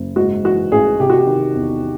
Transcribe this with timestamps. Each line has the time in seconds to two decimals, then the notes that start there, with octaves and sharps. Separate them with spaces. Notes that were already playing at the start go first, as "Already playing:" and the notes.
Already playing: F#1
0.16 G#2 F#4
0.44 E3 F#4
0.71 A1 G#4
1.00 C3 G4
1.10 F#4
1.18 G4
1.27 D#3
1.55 E2